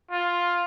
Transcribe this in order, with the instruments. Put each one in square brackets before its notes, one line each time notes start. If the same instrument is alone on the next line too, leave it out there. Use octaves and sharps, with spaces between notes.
[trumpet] F4